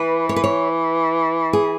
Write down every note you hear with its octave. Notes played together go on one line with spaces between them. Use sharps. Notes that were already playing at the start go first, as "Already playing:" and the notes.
Already playing: E3 B4
C#5
B4
C#5
G#4